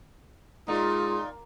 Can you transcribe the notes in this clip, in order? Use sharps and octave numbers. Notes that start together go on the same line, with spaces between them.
A#2 G#3 D#4 F4